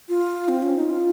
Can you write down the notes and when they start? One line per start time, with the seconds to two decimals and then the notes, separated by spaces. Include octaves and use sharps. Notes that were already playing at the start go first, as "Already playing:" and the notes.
0.09 F4
0.48 C4
0.63 C#4
0.76 D#4
0.90 F4